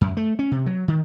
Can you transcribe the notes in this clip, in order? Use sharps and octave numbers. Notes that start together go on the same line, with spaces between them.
F#2
A3
C#4
C3
F#3
D#3